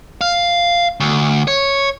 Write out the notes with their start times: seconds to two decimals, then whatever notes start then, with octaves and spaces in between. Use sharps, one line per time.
0.21 F5
1.00 D2
1.48 C#5